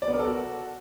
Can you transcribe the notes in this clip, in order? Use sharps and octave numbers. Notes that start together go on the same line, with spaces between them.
D5
B3
A#4
A4
F#4